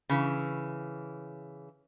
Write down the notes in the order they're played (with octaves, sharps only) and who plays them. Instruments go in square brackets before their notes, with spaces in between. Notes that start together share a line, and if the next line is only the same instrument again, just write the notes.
[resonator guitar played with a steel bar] C#3 E3